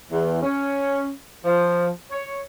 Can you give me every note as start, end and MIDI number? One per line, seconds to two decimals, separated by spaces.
0.11 0.41 40
0.43 1.11 61
1.45 1.88 53
2.12 2.39 73